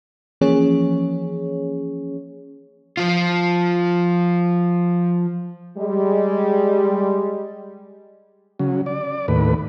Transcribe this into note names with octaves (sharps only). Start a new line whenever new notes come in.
E3 F3 A#3 C#4 G#4 C#5
F3 F4
G3 G#3
C#3 F#3
D5
D#2 A2 B4